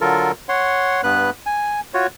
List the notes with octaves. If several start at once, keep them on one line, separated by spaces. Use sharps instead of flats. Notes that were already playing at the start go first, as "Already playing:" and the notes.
D3 F#3 F4 A4 A#4
C#5 F#5 C6
G2 B3 B4 F#6
G#5
F4 F#4 C#5